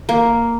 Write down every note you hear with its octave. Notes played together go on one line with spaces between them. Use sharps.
A#3